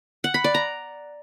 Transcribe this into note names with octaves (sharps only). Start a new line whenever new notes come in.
F#5
B5
D5
A#5